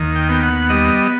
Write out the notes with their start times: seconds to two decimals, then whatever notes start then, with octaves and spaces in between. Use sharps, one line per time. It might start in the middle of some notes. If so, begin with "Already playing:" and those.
Already playing: D#2 D#3
0.16 G5
0.29 B3 G5
0.43 F#5
0.70 G3 D#5